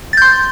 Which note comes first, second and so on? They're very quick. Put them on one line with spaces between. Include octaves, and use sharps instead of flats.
A6 G6 C6